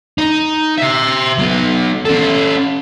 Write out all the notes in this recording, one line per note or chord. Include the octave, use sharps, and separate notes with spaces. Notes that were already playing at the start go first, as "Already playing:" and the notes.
D#4
C5 E5
F#3 B3
C#4 A4